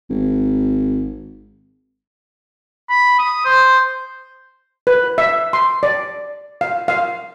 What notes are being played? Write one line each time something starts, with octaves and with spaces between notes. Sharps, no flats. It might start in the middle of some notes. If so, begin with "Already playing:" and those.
G#1
B5
D#6
C5
B4
E5
C6
D5
F5
F5